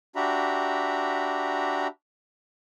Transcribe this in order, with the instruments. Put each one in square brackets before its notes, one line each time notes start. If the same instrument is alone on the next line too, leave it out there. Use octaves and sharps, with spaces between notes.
[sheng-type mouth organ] D4 F#4 G4 E5 A#5 B5